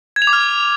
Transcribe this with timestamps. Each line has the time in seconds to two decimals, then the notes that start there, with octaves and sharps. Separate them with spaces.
0.16 G#6
0.22 F7
0.27 D6
0.33 F6